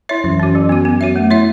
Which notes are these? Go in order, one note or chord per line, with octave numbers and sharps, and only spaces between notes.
E4 C#5 E5
F#2 E3
C#4 F#4
F#3
B3 F#4
B3
F#4 C#5 E5
A3
E4 C#5 E5